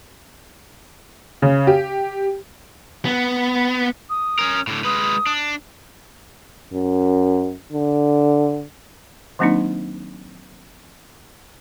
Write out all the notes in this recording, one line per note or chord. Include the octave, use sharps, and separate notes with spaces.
C#3
G4
B3
D#6
C#4 A#4
A2 D3
G#3 B4 D#6
D4
F#2
D3
D#3 F#3 A#3 C4 D4 D#4